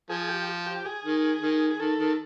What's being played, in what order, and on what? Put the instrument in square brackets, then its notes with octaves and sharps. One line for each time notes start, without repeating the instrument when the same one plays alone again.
[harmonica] F3 [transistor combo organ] G#4
[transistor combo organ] G4
G4
G#4
[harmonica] D#3
D#3
[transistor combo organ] G#4
[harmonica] D#3 [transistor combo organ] A4
[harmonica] D#3